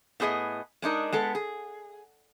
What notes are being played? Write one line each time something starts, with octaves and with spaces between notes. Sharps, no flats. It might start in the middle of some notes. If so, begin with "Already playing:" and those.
A2 B3 G#4 C5 D#5
G#3 D4 D#4 A#4
G#3 B3 A4
G#4